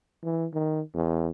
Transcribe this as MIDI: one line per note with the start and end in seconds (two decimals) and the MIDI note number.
0.24 0.46 52
0.54 0.81 51
0.94 1.30 40